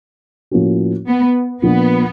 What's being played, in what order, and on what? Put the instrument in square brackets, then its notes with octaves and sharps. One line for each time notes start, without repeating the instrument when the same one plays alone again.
[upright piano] A2 F3 A#3 C#4 F#4
[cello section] B3
[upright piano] A#2 F3 A#3 D4 [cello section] B3